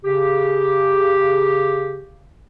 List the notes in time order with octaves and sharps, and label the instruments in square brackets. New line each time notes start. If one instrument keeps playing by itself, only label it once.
[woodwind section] C#3 G4